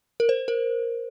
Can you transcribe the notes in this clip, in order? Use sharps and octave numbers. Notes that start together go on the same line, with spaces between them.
A#4
C5
A#4